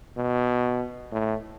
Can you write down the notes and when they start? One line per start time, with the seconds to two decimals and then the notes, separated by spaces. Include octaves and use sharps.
0.17 B2
1.12 A2